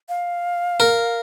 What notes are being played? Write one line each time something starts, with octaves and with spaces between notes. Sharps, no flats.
F5
A#4